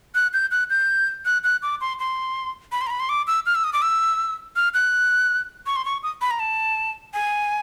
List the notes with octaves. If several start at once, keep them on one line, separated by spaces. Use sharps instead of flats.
F#6
G6
F#6
G6
F#6
F#6
D6
C6
C6
B5
C6
A#5
B5
C6
D6
E6
F6
E6
D#6
D6
E6
F6
F#6
C#6
C6
C#6
D#6
B5
A#5
A5
G#5